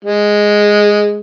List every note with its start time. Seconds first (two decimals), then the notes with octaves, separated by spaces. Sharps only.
0.05 G#3